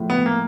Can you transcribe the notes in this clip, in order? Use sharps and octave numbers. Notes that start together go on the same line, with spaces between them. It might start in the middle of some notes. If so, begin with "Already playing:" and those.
Already playing: A2 F3 G#3
B3
A2
A#3